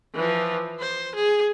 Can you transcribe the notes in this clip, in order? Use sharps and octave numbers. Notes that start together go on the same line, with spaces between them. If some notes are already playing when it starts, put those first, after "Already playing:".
E3 F3
C5
G#4